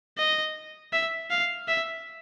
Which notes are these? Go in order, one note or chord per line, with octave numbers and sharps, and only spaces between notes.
D#5
E5
F5
E5